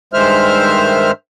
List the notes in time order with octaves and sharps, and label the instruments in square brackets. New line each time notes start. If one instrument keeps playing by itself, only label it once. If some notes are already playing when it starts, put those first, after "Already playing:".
[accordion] G2 D#3 G#3 C5 E5 F6